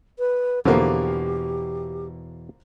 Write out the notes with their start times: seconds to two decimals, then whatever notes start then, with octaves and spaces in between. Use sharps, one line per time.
0.19 B4
0.65 E2 B2 D3 F3 A#3 G4